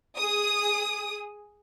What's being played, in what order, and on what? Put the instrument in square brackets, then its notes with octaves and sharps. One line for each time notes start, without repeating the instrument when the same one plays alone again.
[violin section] G#4 D#6